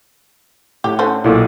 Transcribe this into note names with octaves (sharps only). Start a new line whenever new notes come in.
A2 G4
D3 C#4 C5
B1 A#2 E4 A4